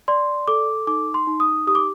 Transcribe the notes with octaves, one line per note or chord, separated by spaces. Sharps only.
D5 C6
A4 D6
D#4 D6
C6
D#4
D#6
G4 D#6
D6